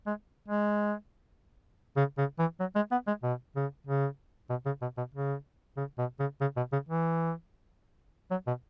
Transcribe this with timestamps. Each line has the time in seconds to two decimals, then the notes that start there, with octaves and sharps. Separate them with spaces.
0.06 G#3
0.48 G#3
1.97 C#3
2.18 C#3
2.39 E3
2.60 F#3
2.75 G#3
2.91 B3
3.07 G#3
3.23 B2
3.56 C#3
3.87 C#3
4.50 B2
4.66 C#3
4.82 B2
4.97 B2
5.14 C#3
5.77 C#3
5.98 B2
6.19 C#3
6.41 C#3
6.56 B2
6.72 C#3
6.89 E3
8.31 F#3
8.47 B2